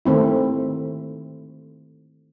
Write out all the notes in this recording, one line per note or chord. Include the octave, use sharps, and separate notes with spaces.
D#3 A3 C4 E4